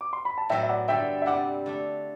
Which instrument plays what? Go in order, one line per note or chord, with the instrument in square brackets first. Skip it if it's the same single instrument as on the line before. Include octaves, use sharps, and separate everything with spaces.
[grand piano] D6
C6
B5
A5
[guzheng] A2 F#3 B3 E4 [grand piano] E5 G5
[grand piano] E5
D5 F#5
[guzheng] G2 D3 A3 [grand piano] E5 G5
[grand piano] E5
[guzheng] C3 G3 C4 E4 [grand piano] D5 F#5
[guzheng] D3 A3 D4